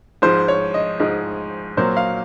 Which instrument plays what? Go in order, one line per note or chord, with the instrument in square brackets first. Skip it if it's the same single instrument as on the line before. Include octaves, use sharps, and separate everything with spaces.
[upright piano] G#2 F3 G#3 C5
C#5
D#5
G#2 F3 G#3 D#5
A#2 F#3 A#3 C5
F5